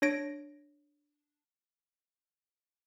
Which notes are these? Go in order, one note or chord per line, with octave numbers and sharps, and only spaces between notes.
D4 C#5 A#6 D7